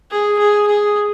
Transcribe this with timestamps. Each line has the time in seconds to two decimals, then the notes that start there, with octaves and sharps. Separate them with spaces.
0.11 G#4
0.39 G#4
0.67 G#4